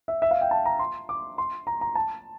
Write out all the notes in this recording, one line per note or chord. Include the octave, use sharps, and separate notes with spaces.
E5
E5
F5
G5
A5
A#5
C6
D6
C6
A#5
A#5
A5